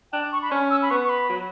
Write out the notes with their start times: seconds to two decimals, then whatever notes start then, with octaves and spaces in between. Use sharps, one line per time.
0.12 D4 G5
0.32 C#6
0.42 B5
0.51 C#4 C#6
0.71 E6
0.82 B5
0.90 B3 C#6
1.05 C#6
1.09 B5
1.29 F#3